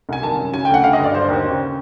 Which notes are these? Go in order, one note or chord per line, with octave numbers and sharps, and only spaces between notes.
C2 G#5
D#3 A5
F#2
C#3 G#5
G5
D2 F#5
D3 F5
D#5
G2 D5
D3 C5
D#2
C#3